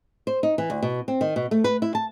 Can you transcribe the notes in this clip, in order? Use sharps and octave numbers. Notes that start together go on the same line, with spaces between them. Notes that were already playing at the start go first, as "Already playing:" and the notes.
C5
D#4
E3
D2
B2
C4
D#3
B2
A3
B4
E4
A5